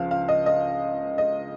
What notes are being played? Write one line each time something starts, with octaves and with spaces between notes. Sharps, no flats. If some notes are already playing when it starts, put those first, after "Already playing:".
Already playing: C#2 C#3 F3 F5
F5
D#5
D#5
D#5